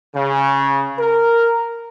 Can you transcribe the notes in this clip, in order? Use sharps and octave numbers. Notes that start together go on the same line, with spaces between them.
C#3
A#4